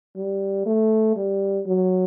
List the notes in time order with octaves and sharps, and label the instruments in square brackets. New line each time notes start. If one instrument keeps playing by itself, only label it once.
[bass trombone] G3
A3
G3
F#3